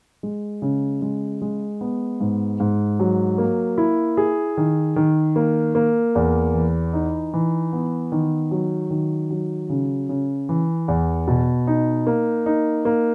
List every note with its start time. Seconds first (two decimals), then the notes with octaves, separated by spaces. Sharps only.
0.23 G#3
0.62 C#3
1.02 G#3
1.42 G#3
1.81 B3
2.20 G#2
2.60 G#2
3.00 F#3
3.38 A#3
3.78 E4
4.17 G#4
4.57 D#3
4.96 D#3
5.36 A#3
5.75 A#3
6.15 E2
6.54 E3
6.93 D#4
7.33 E3
7.73 B3
8.12 D#3
8.51 F#3
8.90 D#3
9.30 F#3
9.69 C#3
10.09 C#3
10.49 E3
10.88 E2
11.27 B2
11.67 D#4
12.07 A#3
12.46 D#4
12.85 A#3